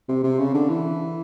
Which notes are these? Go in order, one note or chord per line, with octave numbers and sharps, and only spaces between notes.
C3
C3
C#3
D3
E3